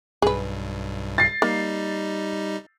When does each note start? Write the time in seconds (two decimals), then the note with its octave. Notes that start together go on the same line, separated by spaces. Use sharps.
0.22 B1 G2 G#4 B4
1.18 A6 C7
1.42 G3 A#3 D#4